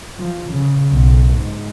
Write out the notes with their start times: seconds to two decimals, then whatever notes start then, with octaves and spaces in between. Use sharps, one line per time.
0.16 F3
0.49 C#3
0.93 B1
1.32 G#2